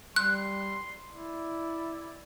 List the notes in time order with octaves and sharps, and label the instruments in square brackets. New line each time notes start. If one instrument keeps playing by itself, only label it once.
[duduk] G3 [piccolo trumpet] C6 [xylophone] F#6
[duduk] E4 [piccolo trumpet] D5